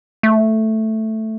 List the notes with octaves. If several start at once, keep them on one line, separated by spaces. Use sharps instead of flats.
A3